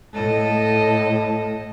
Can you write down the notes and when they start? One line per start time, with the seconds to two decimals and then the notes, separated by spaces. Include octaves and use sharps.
0.13 A2 A4 D#5